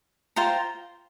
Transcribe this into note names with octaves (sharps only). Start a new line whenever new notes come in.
F4 C5 G5 A#5